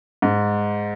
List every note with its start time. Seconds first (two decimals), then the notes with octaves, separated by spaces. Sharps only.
0.22 G#2